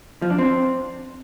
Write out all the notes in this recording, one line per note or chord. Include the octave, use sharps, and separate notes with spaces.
F3
D4
C4